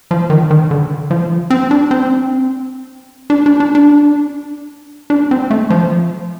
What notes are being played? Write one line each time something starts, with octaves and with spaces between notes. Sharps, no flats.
F3
D#3
D#3
D3
F3
C4
D4
C4
D4
D4
D4
D4
D4
C4
A3
F3